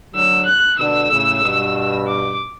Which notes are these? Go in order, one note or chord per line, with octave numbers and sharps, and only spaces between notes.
D3 F#3 E6
F#6
B2 D3 E6
A2 C#3
G2 B2
D6